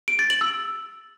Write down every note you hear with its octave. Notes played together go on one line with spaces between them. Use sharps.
D7
A6
F#7
E6